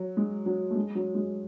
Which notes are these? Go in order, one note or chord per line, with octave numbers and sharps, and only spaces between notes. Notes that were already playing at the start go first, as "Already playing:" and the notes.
Already playing: F#3
G#3
F#3
A3
G#3
F#3
G#3